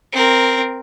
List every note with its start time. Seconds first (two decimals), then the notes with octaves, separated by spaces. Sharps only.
0.12 C4 A#4